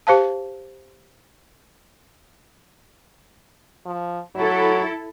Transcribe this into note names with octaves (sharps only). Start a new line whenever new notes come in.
G4 C5 F5 A5
F3
F#3 E4 A4